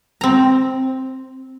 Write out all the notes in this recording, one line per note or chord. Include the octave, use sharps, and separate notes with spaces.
C4 A#5